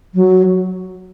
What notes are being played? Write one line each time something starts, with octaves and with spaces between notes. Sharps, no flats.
F#3